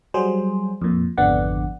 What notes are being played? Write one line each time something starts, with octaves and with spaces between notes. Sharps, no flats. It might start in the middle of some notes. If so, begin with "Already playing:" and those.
F#3 G3 G#4 C5
F2 A#2
G#1 F2 D3 B3 D5 F#5